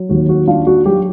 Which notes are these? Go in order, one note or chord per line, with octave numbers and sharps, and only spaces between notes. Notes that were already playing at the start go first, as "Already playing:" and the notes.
Already playing: F#3
D#2 F#4
F#4
D4 F4
F#4
F#3 G4